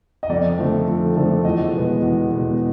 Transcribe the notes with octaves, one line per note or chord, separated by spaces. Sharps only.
D#5
F2 D5
D3 F3 A3
F2
D3 F3 A3
E2 D#5
B2 G#3 B3
E2
B2 G#3 B3